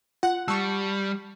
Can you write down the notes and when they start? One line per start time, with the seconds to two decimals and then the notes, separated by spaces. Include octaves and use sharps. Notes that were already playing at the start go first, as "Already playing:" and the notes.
0.23 F4 F#5 F#6
0.48 G3 A5 C#6 E6 C#7